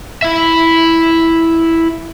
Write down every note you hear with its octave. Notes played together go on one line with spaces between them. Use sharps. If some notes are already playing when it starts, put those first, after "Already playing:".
E4 E5